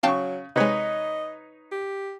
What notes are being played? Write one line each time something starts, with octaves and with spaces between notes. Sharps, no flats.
C#3 F#3 F5 G5 A5 C#6
C3 G#3 D#4 B4 C#5 D#5
G4